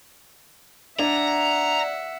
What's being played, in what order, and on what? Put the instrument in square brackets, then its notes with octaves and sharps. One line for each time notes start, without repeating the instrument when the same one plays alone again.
[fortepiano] D4 [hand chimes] D5 [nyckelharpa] E5 F#5 [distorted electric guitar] A#5